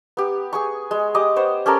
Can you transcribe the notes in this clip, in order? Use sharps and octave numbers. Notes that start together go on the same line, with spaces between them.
B3 G4
G#4 G#5 C#6
G#3
G4 D#5 D6 D#6
B3 C5 C#5
C#4 G4 A4 A#4